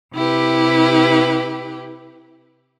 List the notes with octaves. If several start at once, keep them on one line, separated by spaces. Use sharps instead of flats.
C3 E4 G4 B4